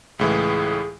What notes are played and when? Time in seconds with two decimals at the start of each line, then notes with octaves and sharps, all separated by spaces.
0.19 C#2 A2 E3 G#4